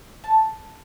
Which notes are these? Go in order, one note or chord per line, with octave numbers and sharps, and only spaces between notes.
A5